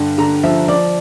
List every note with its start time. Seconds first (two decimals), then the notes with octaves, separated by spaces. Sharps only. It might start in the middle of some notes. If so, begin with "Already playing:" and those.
Already playing: G2 D3
0.18 D3 A#5
0.44 F3 E5
0.68 F3 D5